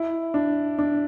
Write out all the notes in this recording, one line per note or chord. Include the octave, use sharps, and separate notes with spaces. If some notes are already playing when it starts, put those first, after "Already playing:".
Already playing: E4
D4
D4